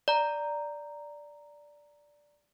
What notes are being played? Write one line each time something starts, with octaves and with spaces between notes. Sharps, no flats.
D5 A#5